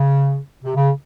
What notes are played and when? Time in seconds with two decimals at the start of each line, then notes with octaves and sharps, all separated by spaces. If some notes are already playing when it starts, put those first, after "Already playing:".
Already playing: C#3
0.64 C3
0.76 C#3